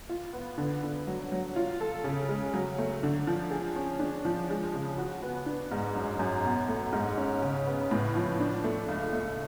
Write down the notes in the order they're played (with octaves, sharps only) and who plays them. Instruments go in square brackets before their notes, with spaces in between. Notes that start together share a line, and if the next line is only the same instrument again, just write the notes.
[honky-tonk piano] F4
B3
D3
D3
F#3
F#3
F4
A4
C#3
G#3
F#3
A3
D3
F3
G#4
C#4
D4
F3
G#3
C#3
F#4
B3
D4
G#2
F#2
F#2
B2
A3
G#2
C#4
C#3
B3
A2
F3
D4
A3
C#2
A3